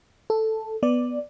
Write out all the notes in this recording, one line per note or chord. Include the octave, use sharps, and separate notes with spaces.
A4
B3 D5